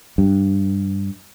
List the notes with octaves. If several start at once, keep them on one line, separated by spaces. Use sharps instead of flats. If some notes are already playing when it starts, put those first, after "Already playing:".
G2